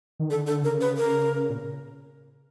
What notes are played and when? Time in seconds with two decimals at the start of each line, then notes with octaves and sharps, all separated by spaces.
0.20 D#3
0.29 D3 A4
0.47 A4
0.63 C#3 A#4
0.81 B4
0.97 A#4
1.50 A#2